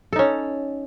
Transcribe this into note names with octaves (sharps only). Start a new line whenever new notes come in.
C#4 D#4 A4